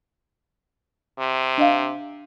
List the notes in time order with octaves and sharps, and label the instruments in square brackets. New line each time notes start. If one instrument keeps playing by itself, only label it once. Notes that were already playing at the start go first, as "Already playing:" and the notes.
[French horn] C3
[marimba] D4 D#5 F5